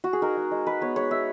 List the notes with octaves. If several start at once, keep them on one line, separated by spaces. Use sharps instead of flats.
F#4
G#4
D#4 A#4
G#3
G#3
G#3 B4
B3 C#5
G#3 C#5
D#4 E5